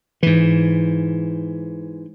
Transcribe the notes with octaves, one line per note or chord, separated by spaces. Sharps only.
G#2 E3